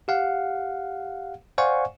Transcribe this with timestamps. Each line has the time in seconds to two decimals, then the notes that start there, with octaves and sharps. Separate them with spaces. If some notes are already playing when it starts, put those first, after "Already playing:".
0.08 G4 F5 F#5
1.58 C5 D5 F5 F#5 G#5 C#6